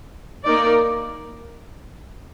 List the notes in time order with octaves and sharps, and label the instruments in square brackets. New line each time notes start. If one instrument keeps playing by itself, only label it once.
[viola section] A#3 D#4 A#4 D5